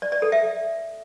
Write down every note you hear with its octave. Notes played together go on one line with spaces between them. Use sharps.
D5
D5
A4
E5